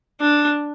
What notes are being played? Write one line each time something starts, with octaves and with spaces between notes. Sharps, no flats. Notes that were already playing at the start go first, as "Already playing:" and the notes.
D4